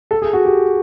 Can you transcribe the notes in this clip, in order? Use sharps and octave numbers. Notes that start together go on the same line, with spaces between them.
A4
G#4
F#4
G4